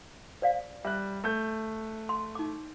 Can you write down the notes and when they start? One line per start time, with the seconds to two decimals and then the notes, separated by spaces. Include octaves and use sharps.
0.42 C5 D5 F5
0.84 G3 E5 F#6
1.24 A3 G6
2.09 C6
2.35 D#4 D6